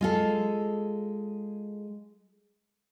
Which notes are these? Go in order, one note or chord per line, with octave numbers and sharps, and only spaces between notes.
G#3 F4 A4